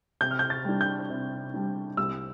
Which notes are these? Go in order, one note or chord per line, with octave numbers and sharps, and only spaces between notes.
C3 G6
F6
G6
A6
G3 D4
G6
C3
G3 D4
C2 E6